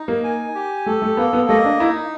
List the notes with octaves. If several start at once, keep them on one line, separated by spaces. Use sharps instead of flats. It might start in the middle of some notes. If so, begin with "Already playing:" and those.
Already playing: D#4
A#3
G#5
G4
A3 A4
A3
A#3 B3
B3
A3 D#5
D4
D#4 E4